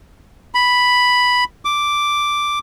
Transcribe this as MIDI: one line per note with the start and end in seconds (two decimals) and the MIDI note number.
0.55 1.44 83
1.65 2.59 86